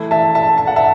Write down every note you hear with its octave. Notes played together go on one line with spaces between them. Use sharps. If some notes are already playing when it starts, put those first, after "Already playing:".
Already playing: E3 A3 E4
E5 A5
E5 A5
A5
F#5
E5 A5